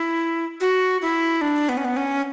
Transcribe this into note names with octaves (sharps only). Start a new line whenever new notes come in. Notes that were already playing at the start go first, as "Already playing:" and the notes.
Already playing: E4
F#4
E4
D4
B3
C#4
B3
C#4